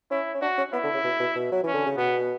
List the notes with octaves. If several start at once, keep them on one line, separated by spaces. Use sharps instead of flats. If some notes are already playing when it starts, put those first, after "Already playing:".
C#4 E4
C#4
D4 F#4
C#4
B3 E4
D3
C#3
B2
B2
B2
F#3
E3 C#4
D3
C#3
B2 B3